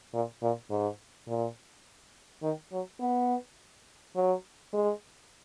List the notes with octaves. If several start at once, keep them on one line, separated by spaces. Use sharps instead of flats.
A#2
A#2
G#2
A#2
D#3
F#3
B3
F#3
G#3